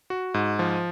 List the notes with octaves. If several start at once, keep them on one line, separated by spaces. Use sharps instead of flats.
F#4
G#2
F3